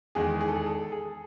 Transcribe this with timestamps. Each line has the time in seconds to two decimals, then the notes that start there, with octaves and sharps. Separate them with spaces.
0.15 E2 D#3 G#3 G#4
0.41 G#4
0.48 A4
0.56 G#4
0.66 A4
0.92 G#4